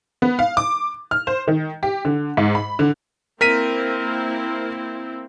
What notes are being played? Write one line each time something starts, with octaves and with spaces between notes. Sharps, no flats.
B3
F5
D6
F6
C5
D#3
G4
D3
G#2
B5
D3
A#3 C4 E4 A#4 B6 D#7